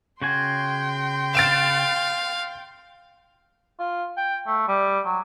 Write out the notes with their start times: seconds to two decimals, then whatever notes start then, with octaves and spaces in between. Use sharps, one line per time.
0.22 C#3 F#4 G5 G#5 C6
1.35 F5 A6 D7 E7
3.79 F4
4.17 G5
4.47 A3
4.68 G3
5.05 F#3